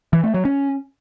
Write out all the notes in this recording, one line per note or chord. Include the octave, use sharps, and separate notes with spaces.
E3
A3
F#3
C#4